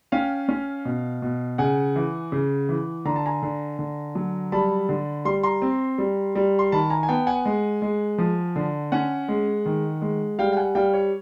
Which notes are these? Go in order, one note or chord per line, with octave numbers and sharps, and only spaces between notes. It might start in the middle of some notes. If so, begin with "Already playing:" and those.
C#4 F5 G5
C#4
B2
B2
C#3 F#5 G#5
E3
C#3
E3
D3 A#5
A5
G#5 A#5
D3
D3
F#3
G3 A5 B5
D3
G3 C6
A#5 C6
C4
G3
G3
C6
D#3 A5 B5
G#5 A#5
G#5
B3 G5 A5
F#5 G#5
G#3
G#3
F3
D3
C#4 F#5 G#5
G#3
D#3
G#3
G3 F5 G5
G5
F#5 G#5
G3 F5 G5
C#5